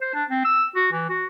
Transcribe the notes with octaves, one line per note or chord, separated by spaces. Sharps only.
C5
D4
C4
E6
F#4
E3
F#4